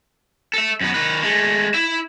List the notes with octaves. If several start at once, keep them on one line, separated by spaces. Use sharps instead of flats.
A4 E5
F#2 B3
D#3 B4
G#3 A3
E4 E5